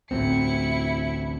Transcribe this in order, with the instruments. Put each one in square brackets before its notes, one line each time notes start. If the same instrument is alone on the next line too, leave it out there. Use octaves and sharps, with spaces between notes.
[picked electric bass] A1 D2 A2 [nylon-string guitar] C4 [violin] E4 C#7